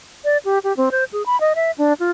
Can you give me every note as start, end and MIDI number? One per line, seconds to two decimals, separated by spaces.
0.25 0.38 74
0.45 0.59 67
0.64 0.76 67
0.77 0.89 60
0.91 1.04 72
1.13 1.25 68
1.26 1.39 83
1.41 1.53 75
1.55 1.71 76
1.78 1.93 62
2.00 2.11 65